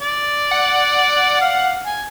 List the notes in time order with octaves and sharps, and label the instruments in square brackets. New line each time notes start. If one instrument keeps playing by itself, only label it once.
[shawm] D5
[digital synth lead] F#5
[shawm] F5
G#5